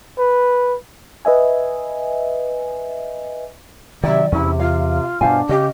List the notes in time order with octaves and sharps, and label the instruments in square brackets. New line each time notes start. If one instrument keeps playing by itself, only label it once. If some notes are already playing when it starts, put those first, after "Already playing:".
[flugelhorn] B4
[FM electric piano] B4 D#5 E5 G#5
[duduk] C3 [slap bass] D#3 F#3 [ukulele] D5 [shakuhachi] E5
[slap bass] E2 [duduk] C3 [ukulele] C#4 [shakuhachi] E4
[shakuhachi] F4 [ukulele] F5
[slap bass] G2 B2 [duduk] D4 [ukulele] C5 F5 G#5
[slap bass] C#3 [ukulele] C#4 D#5 [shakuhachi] G4